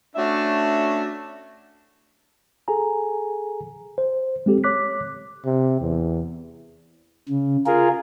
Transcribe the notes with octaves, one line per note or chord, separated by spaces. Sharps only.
A3 C#4 D4 F#4 E5
G#4 A4 G#5 A#5
C5
G#3 C4 G4 A4
C#5 D6 F#6 B6
C3
E2
C#3
F4 G#4 A#4